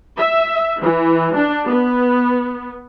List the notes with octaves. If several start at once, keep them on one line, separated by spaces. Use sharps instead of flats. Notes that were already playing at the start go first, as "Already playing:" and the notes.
E5
E3
D4
B3